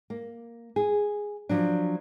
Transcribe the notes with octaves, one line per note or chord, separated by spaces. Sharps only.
A#3
G#4
F3 F#3 D4